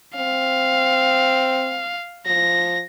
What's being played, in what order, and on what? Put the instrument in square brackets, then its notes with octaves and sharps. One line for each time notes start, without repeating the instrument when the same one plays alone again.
[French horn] C4 [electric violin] F5
[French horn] F3 [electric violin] A#6